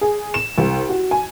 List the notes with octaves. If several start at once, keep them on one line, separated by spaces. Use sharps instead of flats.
G#4
E7
C2
F#4
G#5